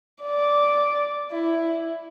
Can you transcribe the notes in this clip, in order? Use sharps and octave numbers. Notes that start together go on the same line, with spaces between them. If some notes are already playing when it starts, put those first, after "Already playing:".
D5
E4